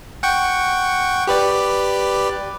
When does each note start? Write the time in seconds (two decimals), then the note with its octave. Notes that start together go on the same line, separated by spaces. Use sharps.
0.23 F#5 G5 C#6
1.27 G4 B4 D5